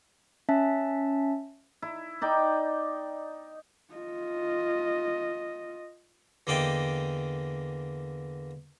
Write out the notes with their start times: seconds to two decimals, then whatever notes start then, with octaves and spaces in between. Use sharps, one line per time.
0.49 C#4 E5 A5
1.82 E4
2.21 D#4 D5 G5
3.94 F4 D#5
6.47 E2 D3 A#3 D5 D#5 G5